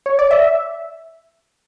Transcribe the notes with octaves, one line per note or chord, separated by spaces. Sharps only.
C#5
D5
E5